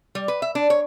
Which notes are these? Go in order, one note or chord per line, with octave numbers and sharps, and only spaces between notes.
G3
B4
E5
D4
C#5